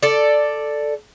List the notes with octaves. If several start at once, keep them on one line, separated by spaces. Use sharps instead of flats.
A4 D5